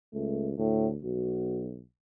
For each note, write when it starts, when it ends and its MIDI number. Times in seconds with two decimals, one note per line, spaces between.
0.14 0.57 37
0.14 0.49 57
0.58 0.97 38
0.58 0.87 45
1.03 1.81 35
1.03 1.68 66